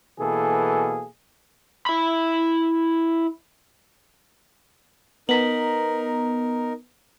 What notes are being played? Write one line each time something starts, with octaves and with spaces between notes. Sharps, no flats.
B2 E3 A#3 G#4 A4
E4 B5
B3 D#4 A#4 A#5 B6 F#7